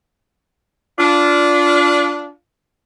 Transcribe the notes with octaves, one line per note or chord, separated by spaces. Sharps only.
D4 F4